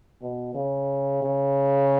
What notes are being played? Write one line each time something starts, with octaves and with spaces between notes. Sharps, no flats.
B2
C#3
C#3